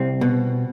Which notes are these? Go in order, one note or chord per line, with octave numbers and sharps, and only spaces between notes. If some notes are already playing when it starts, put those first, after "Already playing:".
Already playing: C2 C4
B2